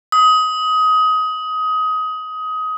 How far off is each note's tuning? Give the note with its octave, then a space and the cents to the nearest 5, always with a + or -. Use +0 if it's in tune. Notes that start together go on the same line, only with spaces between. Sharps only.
D#6 +20